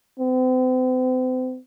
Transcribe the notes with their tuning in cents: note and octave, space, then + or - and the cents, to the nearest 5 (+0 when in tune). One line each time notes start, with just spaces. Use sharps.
C4 -40